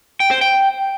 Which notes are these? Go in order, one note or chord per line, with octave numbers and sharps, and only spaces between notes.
G5
C5
G5